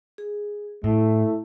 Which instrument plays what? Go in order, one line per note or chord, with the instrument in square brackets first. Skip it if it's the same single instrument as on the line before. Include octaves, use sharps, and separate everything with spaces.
[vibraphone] G#4
[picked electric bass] A2 [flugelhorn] A3 [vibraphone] E4